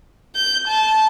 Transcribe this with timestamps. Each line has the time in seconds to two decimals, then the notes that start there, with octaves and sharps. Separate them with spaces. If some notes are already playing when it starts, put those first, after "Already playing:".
0.36 G6
0.67 A5